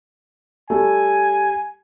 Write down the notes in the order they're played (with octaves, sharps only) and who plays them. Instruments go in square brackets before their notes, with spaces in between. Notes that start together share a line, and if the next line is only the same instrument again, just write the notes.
[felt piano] G3 [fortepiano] A3 [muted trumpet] G#5